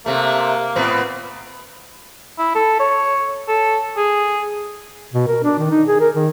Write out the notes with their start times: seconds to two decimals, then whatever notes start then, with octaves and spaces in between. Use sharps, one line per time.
0.06 C3 A3 A#3
0.76 A2 B3 C4
2.39 E4
2.55 A4
2.80 C#5
3.48 A4
3.97 G#4
5.13 B2
5.27 A#4
5.43 D4
5.59 D#3
5.70 D#4
5.88 G#4
6.01 A#4
6.15 D#3